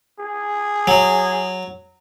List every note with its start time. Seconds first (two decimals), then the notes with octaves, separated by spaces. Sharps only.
0.19 G#4
0.87 F#3